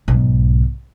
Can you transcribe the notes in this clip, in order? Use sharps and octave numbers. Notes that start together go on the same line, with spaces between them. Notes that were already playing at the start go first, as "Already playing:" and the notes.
B1 G#2